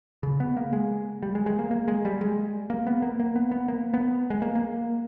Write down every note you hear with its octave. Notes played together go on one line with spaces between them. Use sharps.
C#3
B3
A#3
G#3
G3
G#3
G#3
A#3
A#3
G#3
G3
G#3
A#3
B3
A#3
A#3
B3
B3
A#3
B3
G#3
A#3
A#3